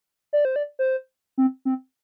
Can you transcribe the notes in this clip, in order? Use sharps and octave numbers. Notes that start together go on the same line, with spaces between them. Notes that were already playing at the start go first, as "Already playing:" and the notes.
D5
C5
D5
C5
C4
C4